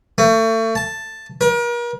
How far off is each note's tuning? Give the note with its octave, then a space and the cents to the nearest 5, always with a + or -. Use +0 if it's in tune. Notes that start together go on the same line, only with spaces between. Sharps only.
A3 +35
A5 +5
A#4 +40